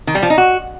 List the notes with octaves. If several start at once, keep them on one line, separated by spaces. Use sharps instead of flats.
D#3
G3
F3
D#4
F#4